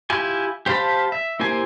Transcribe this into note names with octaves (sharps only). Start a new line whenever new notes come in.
E4 F4 G4 G#5
G4 C5 F5 A5 B5
E5
A#3 E4 G4 C5 G#5